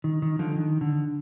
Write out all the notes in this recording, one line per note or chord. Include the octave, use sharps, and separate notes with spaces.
D#3
D#3
D3 F3
D#3
D3